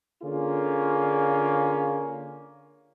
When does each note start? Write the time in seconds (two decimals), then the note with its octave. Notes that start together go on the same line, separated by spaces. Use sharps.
0.23 D3 A#3 C#4 F4 G#4